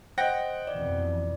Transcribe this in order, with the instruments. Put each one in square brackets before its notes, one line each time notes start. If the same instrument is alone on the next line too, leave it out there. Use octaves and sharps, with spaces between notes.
[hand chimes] C5 D#5 [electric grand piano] F#5 G5 A#6
[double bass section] F2 B2 E3 [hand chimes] D5